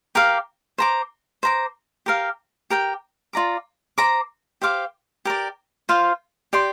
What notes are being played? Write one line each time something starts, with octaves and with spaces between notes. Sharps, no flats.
G4 A#4 F5 D6
C5 A#5 D6
C5 A#5 D6
G4 A#4 F5
G4 A#4 G5
F4 D5 A#5 D6
C5 A#5 D6
G4 C5 F5 D6
G4 A#4 D5
F4 C5 F5
G4 D5 G5 C6